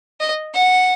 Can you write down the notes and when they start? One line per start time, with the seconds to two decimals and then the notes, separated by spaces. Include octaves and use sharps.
0.20 D#5
0.54 F#5